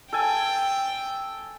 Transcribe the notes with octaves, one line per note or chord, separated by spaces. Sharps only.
A4 G5 G#5